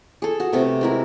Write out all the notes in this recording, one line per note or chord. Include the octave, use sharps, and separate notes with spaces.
G#4 A4
F#4
C3 A3 B3
G#3 E4 A#4